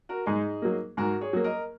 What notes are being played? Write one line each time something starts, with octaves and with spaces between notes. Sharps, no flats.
F#4 A#4
G#2 D#4 G#4
F#3 A#3
G#2 F#4 A#4
G#4 C#5
F#3 A#3
A#4 D#5